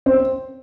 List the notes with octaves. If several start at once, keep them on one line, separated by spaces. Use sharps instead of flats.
C4